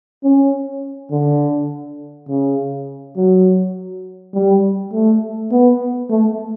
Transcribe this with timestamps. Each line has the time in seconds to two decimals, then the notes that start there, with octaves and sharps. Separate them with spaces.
0.24 C#4
1.11 D3
2.29 C#3
3.17 F#3
4.34 G3
4.93 A3
5.52 B3
6.10 A3